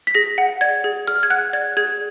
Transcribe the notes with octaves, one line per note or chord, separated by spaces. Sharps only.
B6
G#4 A#6
F#5
D5 G#6
G#4
G#4 F6
G#6
F#5 F#6
D5 G#6
G#4 G#6